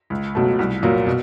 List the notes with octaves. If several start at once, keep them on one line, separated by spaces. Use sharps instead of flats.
C#2
B2 F#3 A3
C2
A#2 F#3 A#3
B2